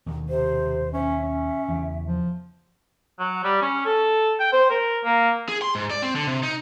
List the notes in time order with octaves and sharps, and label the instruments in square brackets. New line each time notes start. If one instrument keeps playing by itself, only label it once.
[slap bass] D#2 B2 D#3
[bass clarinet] C3 [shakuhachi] C5
[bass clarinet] C#4 [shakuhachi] E5
[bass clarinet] C#4
[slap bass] E2 C#3
[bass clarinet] F3
[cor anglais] F#3
G3
C#4
A4
G5
C5
A#4
A#3
[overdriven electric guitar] G#4
C6
G#2
D5
C4
D3
C3
D#4